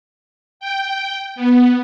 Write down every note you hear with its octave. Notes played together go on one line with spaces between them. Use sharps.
G5
B3